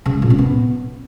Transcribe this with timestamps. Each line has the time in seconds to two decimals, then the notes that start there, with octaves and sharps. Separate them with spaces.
0.06 C#3
0.14 G#3
0.22 A#2
0.30 C#4
0.38 B3